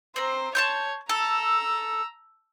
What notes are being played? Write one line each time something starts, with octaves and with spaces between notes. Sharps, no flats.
C4 C5 A#5
C#5 A5 C6 G6
A4 A#5 E6